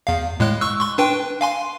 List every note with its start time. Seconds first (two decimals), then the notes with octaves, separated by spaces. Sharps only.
0.07 E2 F5
0.40 A2 G#3 F#6
0.61 C#6 E6 F#6
0.80 C6 C#6
0.98 D4 B4 G5
1.41 F5 G#5 C6